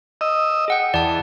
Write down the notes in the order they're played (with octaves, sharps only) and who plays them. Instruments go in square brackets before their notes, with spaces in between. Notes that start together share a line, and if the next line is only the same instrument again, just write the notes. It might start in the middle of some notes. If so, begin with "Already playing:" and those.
[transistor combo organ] D#5 E6
[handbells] G#4 F#5 G5
[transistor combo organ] E2 [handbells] D5 A5